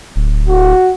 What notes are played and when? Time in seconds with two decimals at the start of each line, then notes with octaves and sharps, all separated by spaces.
0.16 D1
0.49 F#4